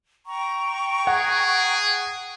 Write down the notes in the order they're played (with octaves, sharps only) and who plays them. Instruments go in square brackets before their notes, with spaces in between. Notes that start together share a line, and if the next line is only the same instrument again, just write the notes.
[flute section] G5 A#5 C#6
[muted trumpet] G#4 [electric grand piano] F#5